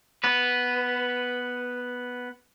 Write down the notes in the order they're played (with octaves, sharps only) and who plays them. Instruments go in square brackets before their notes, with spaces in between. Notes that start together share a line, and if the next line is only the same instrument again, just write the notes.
[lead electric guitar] B3 B4